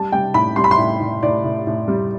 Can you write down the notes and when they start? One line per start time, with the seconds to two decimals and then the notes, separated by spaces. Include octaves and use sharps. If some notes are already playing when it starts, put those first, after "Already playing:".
Already playing: G3 A5
0.12 G3 G5
0.34 A2 B5
0.56 G3 C6
0.64 B5
0.71 C6
0.78 A2
1.00 A2
1.23 A2 D5
1.44 A2
1.67 A2
1.88 G3